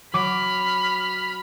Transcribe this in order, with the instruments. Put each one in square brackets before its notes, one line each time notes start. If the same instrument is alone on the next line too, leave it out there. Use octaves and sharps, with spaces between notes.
[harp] F#3 D6 [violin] B5 F6